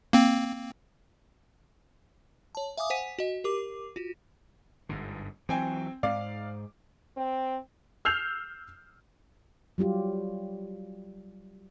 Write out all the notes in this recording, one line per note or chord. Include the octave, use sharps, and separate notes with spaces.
A#3 C4
C#5 A5
E5 F5 G#5 D6 D#6
C5 F#5 G#5 B6 D#7
F#4 D#5
G4 A#4 D6
F4 F#4
G1 G#2 D3
E3 F#3 C4 G5 G#5
G#2 D5 F5 D6
C4
E6 F6 G6 C7 F7
F#3 G3 F4 G4